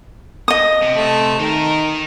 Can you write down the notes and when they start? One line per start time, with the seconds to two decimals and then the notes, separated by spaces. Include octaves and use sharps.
0.48 D#5 D#6
0.82 C3
0.96 A3
1.39 D#3 D#4 A#4